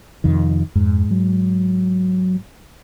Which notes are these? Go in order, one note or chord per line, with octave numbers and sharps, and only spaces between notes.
F2 C3 D#3
F2 G#2
F#3